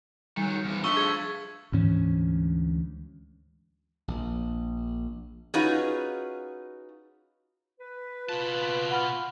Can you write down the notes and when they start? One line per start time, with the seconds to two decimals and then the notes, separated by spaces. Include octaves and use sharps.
0.37 D#3 F#3 G3
0.65 E2 F3
0.84 F3 A3 D4 F5 C#6 E6 B6 G7
0.97 G#4 G#6 G7
1.72 D2 G#2 E3 C#4
4.08 A#1
5.54 C#4 D#4 F4 F#4 G#4 B4
7.80 B4
8.29 B2 F4 A5
8.90 F#5 B5 F6